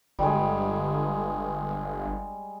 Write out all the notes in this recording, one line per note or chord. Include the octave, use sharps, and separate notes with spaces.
G1 G3 G#3